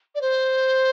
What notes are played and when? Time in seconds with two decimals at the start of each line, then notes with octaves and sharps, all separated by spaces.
0.15 D5
0.21 C5